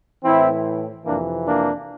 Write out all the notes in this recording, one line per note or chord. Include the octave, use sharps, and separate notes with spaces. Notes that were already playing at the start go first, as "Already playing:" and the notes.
A2 E3 C4 E4
F2 C3 E3 A#3 D4
A#3 D4